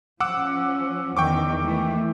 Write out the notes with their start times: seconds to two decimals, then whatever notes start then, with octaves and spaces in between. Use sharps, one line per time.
0.20 F3 C#4 F#5 D6 E6
1.17 E2 D#3 G5 C#6 D6
1.62 E3 A3